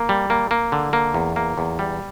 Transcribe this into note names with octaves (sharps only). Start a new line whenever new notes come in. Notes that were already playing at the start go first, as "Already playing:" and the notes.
Already playing: A#3
G3
A#3
A#3
D3
A#3
E2
A#3
E2
G3